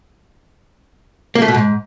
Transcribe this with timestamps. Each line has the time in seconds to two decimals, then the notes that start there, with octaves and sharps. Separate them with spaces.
1.35 A#3
1.42 A3
1.48 B2
1.54 G#2